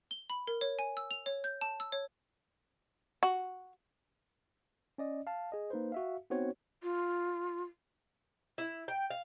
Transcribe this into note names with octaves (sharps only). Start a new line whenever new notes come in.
G7
B5
A#4
C#5
G#5
E6
F7
C#5
G6
A5
E6
C#5
F#4
C#4 D5 D#5
F5 A5
G#4 D#5
A#3 D#4 B4 C5
F#4 E5 F5
B3 C4 D#4 F#4 C5 C#5
F4
E4
G5
F5